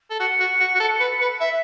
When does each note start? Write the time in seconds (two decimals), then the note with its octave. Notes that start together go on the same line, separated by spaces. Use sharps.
0.10 A4
0.20 F#4 C#7
0.40 F#4
0.60 F#4
0.75 F#4
0.80 A4
1.00 B4
1.21 B4
1.41 E5 B6